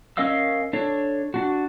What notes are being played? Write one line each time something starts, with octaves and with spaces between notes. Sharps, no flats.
C#4 A#4 D#5 F5 E6
D4 A4 C#5
D4 F#4